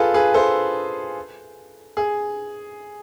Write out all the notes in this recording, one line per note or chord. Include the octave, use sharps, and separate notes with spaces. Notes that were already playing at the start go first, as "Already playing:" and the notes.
Already playing: F4 G#4 A4 B4
G#4 B4
A4 C5
G#4